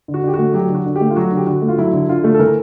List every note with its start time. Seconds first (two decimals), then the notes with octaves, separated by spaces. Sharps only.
0.08 D3
0.14 F#4
0.23 D3 G4
0.34 A3 F#4
0.54 F#3 G4
0.69 D3
0.74 F#4
0.86 D3
0.96 G4
1.01 A3
1.10 F4
1.16 F#3 F#4
1.32 D3 G4
1.46 D3 F#4
1.62 A3
1.68 F4
1.78 F#3 E4
1.93 D3
2.08 D3 F4
2.24 A3
2.35 A4
2.39 E3 A#4